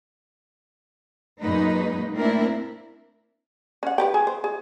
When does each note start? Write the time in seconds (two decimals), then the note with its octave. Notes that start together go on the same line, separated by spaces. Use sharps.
1.41 F#2 A#2 G#3 A#3 D#4 B4
2.16 A3 A#3 C4 D4 E4 A#4
3.83 C#4 F#5
3.98 G4 B4 G5
4.14 G#4 G#5
4.27 C5
4.44 G#4